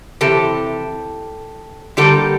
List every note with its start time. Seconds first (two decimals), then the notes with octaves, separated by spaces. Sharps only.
0.21 C3 E3 G4 A4
1.97 D3 G3 A#3 G4 A4